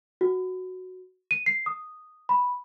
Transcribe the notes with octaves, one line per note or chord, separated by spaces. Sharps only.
F#4
D#7
C7
D#6
B5